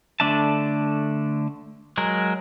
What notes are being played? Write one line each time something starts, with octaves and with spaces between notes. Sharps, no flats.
D3 A3 D4 E5 A5
F#3 G#3 A#4